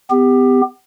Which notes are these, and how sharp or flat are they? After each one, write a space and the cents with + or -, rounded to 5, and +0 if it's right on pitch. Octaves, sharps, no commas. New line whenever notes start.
B3 +35 G4 +20